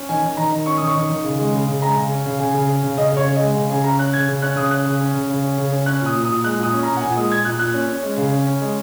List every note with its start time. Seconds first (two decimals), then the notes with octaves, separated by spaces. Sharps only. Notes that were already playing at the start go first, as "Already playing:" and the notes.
Already playing: C#4
0.09 D#3 G#5
0.23 D#3
0.37 D#3 A#5
0.51 D#3
0.66 C#4 C#6
0.77 D#3 D#6
0.87 C#6
0.96 D#3
1.09 D#3
1.24 C#3
1.39 G#3
1.53 C#3
1.67 C#3
1.82 G#3 A#5
1.96 C#3
2.11 C#4
2.26 C#3
2.40 C#3 G#5
2.54 C#3
2.69 C#4
2.83 C#3
2.97 C#3 D#5
3.12 C#3 C#5
3.26 C#3
3.36 D#5
3.41 G#3
3.55 C#3
3.70 C#3 G#5
3.84 C#4 A#5
3.99 C#4 F#6
4.13 C#3 G#6
4.28 C#3
4.42 C#4 F#6
4.56 C#3 D#6
4.71 C#4 F#6
4.86 C#3
5.00 C#4
5.14 C#3
5.29 C#3
5.43 C#4
5.58 C#3
5.72 C#4
5.86 C#4 F#6
6.01 A#2 D#6
6.16 A#2
6.25 D#6
6.30 A#2
6.44 G#3 F#6
6.59 A#2 D#6
6.73 C#4
6.83 A#5
6.88 A#2
6.97 F#5
7.02 A#2 G#5
7.17 G#3 D#6
7.31 A#2 G#6
7.45 A#2 F#6
7.59 A#2 F#6
7.74 C#4
7.89 C#4
8.03 G#3
8.17 C#3
8.32 C#4
8.46 C#4
8.61 G#3